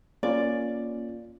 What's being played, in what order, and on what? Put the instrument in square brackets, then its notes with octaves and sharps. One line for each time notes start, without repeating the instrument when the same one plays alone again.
[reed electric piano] A#3 C#4 F4 [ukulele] D5